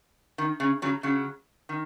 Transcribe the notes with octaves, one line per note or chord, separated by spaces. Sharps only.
D#3
C#3
C#3 F#3
C#3 F#3
D#3